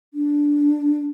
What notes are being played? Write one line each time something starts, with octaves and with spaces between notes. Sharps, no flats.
D4